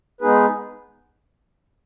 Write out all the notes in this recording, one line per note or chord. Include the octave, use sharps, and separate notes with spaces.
G#3 B3 D#4 G#4 B4